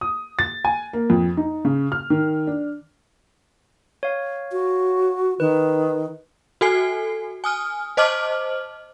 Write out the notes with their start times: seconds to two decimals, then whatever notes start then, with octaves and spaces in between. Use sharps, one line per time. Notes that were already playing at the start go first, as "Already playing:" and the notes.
0.01 D#6
0.39 A6
0.65 G#5
0.93 A#3
1.10 F2
1.37 D#4
1.65 C#3
1.92 F6
2.10 D#3
2.47 D4
4.03 C#5 F5
4.52 F#4
5.40 D#3 B4
6.61 F#4 A4 G#5 C7
7.44 G#5 D#6 F6
7.97 C5 D#5 A5 D6 F6 F#7